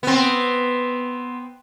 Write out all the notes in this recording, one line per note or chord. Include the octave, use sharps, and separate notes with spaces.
B3 C4